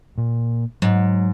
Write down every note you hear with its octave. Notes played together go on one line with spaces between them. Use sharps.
A#2
G#2 F#3